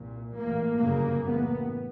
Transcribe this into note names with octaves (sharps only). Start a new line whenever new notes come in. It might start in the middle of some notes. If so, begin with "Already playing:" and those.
Already playing: C2 A#2
A1 A2 A#3
G1 F#2 C#3 A#3
A1 A2 B3